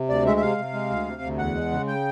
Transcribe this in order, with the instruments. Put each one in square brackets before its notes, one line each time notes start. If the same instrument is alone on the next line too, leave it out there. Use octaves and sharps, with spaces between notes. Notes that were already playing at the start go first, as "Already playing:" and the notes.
Already playing: [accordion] C3
D2 D5
G#3 E5
E5
C3 F5
C3
G#3
D2
C3
D2
E2 F#5
G#3
C#3
G5